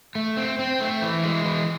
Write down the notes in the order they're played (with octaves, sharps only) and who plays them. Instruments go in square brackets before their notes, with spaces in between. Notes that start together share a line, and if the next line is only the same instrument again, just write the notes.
[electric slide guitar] A3
C4
C4
A3
E3
G#3
E3